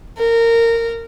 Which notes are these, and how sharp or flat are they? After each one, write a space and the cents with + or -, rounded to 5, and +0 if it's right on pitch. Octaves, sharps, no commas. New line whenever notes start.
A#4 -20